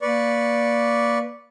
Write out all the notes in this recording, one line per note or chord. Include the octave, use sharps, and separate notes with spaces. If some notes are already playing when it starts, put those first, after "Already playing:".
A#3 B4 D5 C#6